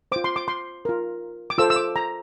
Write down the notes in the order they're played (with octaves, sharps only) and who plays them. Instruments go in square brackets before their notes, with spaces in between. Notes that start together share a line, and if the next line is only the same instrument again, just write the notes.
[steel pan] C5 D6
F4
C6
D6
C6
F4 A#4
D6
F4 A4 C5 E6
E6
D6
A#5